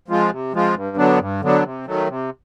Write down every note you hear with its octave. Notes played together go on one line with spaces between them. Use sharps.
F3 G#3 C4 F4
C3
F3 G#3 C4 F4
G2
D3 F#3 B3 D4
G2
D3 F#3 B3 D4
C3
D#3 F#3 A3
C3